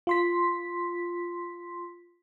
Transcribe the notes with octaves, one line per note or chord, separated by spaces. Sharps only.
F4 C6 B6